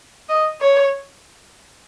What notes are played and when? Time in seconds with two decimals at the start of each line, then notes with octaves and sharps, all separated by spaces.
0.29 D#5
0.61 C#5